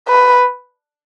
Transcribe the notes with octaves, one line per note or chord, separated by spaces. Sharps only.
B4